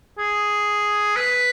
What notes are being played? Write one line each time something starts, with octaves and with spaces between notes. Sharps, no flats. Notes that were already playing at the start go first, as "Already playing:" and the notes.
G#4
B4